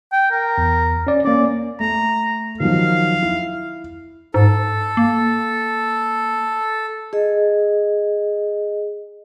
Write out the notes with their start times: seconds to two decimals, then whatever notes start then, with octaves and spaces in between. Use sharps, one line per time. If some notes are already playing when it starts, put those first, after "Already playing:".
0.12 G5
0.31 A#4
0.58 E2
1.07 C#4 D5
1.25 A#3 C#4 D5
1.80 A3 A#5
2.60 D#3 F3 F#3 F5
3.23 E4
4.34 G#2 A4
4.97 A#3
7.13 G#4 D#5